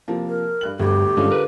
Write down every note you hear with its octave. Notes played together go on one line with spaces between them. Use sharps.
C3 F3 A#3
A#4
G2 F#6 F#7
G1 D2 G2 G4
G2 D3 G#3 C#4 F4
A#4 B4